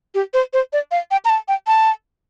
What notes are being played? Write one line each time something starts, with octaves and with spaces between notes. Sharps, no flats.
G4
C5
C5
D5
F5
G5
A#5
A5
G5
A5